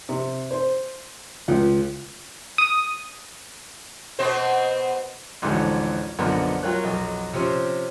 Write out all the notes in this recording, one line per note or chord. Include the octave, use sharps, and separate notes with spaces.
C3
C5
C#2
D#6
B2 C4 C5
A1 D2 G#2 D3 E3 F3
B1 F#2 D3 F3 A#3 B3
F#3 F4 A#4 C#5 F#6
B1 F2 F#3
C3 F3 C4 C#4